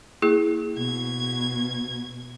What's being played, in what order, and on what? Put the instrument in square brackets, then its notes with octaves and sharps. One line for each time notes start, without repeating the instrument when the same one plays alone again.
[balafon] A#3 E4 G#4
[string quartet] B2 G#6